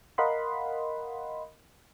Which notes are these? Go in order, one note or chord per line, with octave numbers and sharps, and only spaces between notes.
A#4 D#5 F5 F#5 B5 C6